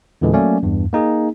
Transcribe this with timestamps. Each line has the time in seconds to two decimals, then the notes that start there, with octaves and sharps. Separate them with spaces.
0.21 E2 A#2 D3 E3 G#3
0.33 F#3 A3 A#3 C#4 D5
0.62 E2 G2
0.93 A#3 D#4 G#4